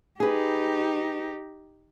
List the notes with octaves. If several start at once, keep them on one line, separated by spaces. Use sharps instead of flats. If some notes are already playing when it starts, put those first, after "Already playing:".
D#4 G4 G#4 B4